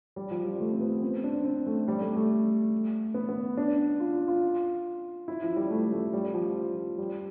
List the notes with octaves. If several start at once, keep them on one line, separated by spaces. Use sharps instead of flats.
G3
F3
G3
A3
C4
B3
C4
D4
C4
A3
G3
A3
A3
B3
B3
D4
F4
F4
F4
E4
F3
G3
A3
A3
G3
F3
G3